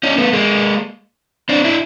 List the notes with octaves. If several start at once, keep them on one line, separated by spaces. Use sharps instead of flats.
C#4 D#4
A3 B3
G#3 A#3
C4 D4
D4 E4